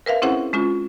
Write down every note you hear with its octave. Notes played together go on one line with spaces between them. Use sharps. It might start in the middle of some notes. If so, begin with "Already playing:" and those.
A#4 B4 E5 F5
C4 C#4 E4 G#4 C5 F#5
G#3 C#4 F4